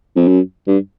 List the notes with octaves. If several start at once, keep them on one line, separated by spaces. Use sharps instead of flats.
F2
F#2
G2